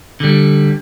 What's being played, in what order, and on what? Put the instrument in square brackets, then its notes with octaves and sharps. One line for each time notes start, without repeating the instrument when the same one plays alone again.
[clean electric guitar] D3 G3